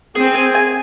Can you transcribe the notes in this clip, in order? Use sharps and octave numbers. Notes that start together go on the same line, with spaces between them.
C4 G#4
G#5
G#5